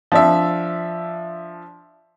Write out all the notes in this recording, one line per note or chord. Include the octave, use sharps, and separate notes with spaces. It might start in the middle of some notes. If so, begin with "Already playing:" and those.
F3 D4 E5